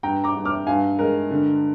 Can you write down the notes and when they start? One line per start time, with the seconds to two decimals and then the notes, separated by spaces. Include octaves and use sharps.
0.03 G2 G5 A#5
0.24 A#5 D6
0.35 G2
0.45 D6 F6
0.67 G2 F5 G#5
0.99 G#3 A#4
1.31 D3